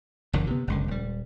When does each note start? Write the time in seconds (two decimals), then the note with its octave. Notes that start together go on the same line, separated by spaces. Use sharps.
0.33 F#1 E2 D3 D#3
0.47 C3 B3
0.67 F#1 C#2 D3
0.88 D#1 G3